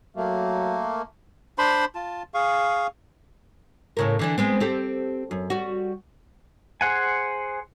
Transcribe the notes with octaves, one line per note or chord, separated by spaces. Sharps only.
F#3 A3 A#3
D4 C5 B5 C6
F4 A5
G#4 F5 C#6
A2 C#3 A#4
D3 E3 D4
G#3 B3 C4
C4 G4 A4
F#2
G3 F#4
G#4 C5 F#5 G#5